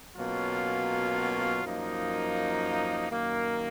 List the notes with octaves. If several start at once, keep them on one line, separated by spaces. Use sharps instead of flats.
B2 F#3 A#3 C#4 F4
F#2 F3 A#3 D#4
F#2 D#3 A#3